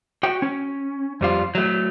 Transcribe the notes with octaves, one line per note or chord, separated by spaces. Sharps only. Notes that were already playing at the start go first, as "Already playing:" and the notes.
F#4 G5
C#4
F2 G3 F4
F#3 A3